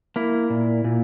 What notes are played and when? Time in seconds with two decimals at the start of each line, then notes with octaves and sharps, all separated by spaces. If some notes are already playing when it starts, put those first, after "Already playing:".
0.16 A#3 E4
0.50 A#2
0.84 A#2